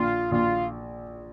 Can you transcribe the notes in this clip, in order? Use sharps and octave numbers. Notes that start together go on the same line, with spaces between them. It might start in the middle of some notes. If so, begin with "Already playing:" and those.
Already playing: A#1 F4
A#1 F4